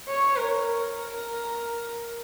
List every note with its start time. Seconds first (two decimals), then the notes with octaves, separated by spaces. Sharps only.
0.08 C#5
0.37 A#4
0.65 A#4